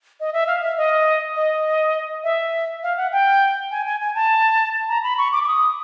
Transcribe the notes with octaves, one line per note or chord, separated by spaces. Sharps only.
D#5
E5
F5
E5
D#5
D#5
E5
F5
F#5
G5
G#5
G#5
G#5
A5
A#5
B5
C#6
D6
D6
D#6